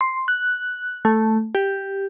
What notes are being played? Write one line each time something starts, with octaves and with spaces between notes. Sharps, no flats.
C6
F#6
A3
G4